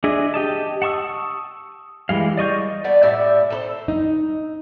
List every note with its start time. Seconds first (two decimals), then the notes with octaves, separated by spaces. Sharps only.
0.04 D4 G#4 D#5 E5
0.34 G4 D#5 A5
0.82 F#5 A5 C#6 D#6 E6
2.09 E3 G3 G#3 F5
2.37 D5 D#5 C#6 G6
2.84 A3 B3 D5
3.02 A2 G4 D5 E5
3.50 A4 B4 C5
3.88 D#4